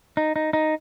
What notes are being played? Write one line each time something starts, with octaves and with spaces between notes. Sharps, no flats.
D#4
D#4
D#4